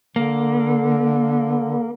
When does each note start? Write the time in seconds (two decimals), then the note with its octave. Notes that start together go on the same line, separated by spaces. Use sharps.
0.16 D3 A#3